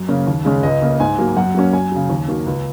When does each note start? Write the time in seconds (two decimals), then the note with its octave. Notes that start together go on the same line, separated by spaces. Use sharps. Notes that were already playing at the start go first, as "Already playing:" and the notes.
Already playing: F#2
0.08 C#3 A#3 C#4
0.27 D#2
0.45 C#3 G#3 C#4
0.63 C#2 D#5
0.82 C#3 A#3
1.00 G#2 G#5
1.18 F#3 A#3
1.37 F#2 F#5
1.55 F#3 A#3 C#4
1.73 F#2 G#5
1.92 C#3 F#3
2.09 D#2
2.28 D#3 F#3 A#3
2.46 C#2